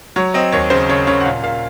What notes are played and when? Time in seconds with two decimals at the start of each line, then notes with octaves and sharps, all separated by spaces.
0.16 F#3 C#5
0.34 C4 D#5
0.52 D#2 C#5
0.70 C#3 C5
0.89 C#3 C#5
1.07 C#3 C#5
1.20 F#5
1.25 A#2 F5
1.43 A#2 F5